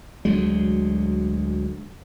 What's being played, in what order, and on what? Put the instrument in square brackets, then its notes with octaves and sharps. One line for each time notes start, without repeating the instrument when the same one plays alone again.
[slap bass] D2 F#3 G#3